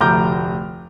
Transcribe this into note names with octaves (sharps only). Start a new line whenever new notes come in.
F1 D2 A#5 D6 F6 G6